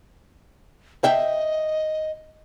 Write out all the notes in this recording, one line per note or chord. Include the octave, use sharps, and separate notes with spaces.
D#5 E5 G5